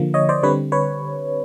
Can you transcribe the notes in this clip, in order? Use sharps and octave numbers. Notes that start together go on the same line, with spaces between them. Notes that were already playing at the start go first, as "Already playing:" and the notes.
Already playing: D3 F3 A#3
C#5 D#5
C5 D5
D3 G3 C4 B4 C#5
B4 C#5